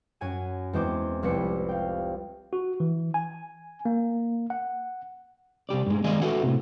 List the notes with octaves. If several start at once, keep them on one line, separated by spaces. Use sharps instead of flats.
F#2 F#4 G#5 G#6 D#7
E2 G#3 C4 C5 D6
F1 C2 G4 B4 C#7
F5 G5
F#4
E3
G#5
A#3
F#5
C2 G2 G4 D5
G2 G#3
D#3 G#3 D5 D#5 F5 G#5
F#4 A4 B4 E5 F#5 G5
A2 C3